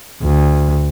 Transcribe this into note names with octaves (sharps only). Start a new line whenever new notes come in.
D2